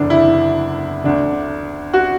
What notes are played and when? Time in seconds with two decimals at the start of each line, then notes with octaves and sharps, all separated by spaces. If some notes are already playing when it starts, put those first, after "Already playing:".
Already playing: F#1 E2 D3 D4
0.10 E4
1.04 D2 D3 D4
1.94 F#4